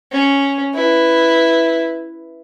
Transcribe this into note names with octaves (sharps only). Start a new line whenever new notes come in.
C#4
E4 B4